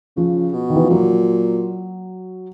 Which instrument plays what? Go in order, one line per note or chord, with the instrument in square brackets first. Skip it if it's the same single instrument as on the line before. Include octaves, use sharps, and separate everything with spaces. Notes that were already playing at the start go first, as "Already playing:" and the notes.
[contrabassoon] C#3 [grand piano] F3
[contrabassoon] B2
[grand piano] D#3
E3
F3
[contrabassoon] A#2 [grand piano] F#3